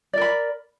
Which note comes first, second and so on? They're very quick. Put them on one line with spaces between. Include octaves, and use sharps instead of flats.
D5 A#4 B5